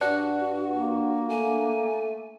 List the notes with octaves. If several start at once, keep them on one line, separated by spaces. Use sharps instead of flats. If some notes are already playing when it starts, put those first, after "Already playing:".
G2 D4 F#4 F#5
A#3
A3 G#5